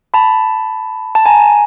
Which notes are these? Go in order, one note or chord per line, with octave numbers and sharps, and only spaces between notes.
A5 B5
A5
G#5 A#5